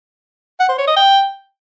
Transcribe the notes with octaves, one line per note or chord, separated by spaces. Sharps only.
F#5
C5
C#5
D#5
G5